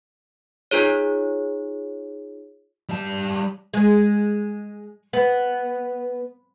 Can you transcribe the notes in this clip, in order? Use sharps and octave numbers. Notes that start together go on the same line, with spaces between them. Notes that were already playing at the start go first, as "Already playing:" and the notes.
D#4 F4 G#4 C#5
G3 A5
G#3
B3